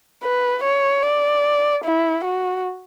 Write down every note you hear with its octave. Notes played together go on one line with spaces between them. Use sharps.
B4
C#5
D5
E4
F#4